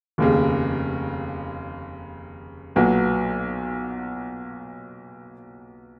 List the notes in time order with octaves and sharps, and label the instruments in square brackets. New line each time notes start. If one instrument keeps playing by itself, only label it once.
[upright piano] F1 D#2 C#3
B1 A#2 F#3 B3 F#4